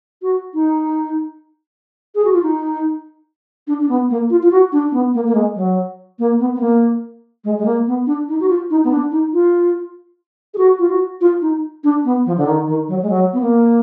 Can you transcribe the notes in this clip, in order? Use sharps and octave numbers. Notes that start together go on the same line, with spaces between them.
F#4
D#4
G#4
F#4
F4
D#4
D4
D4
B3
A#3
F4
F4
F#4
D4
D4
B3
A#3
A#3
G#3
F#3
A#3
B3
B3
A#3
G#3
G#3
A#3
B3
D4
D#4
F#4
F4
D#4
B3
D4
D#4
F4
G#4
F#4
F4
F#4
F4
D#4
D4
B3
F3
D3
D#3
D#3
F#3
G#3
F#3
B3
A#3